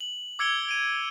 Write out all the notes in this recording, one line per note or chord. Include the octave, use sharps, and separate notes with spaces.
F#7
D6 E6 G#6 C#7 D7 G7
D7 D#7